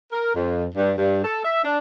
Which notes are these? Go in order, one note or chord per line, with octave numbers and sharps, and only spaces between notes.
A#4
F2
G2
G2
A4
E5
D4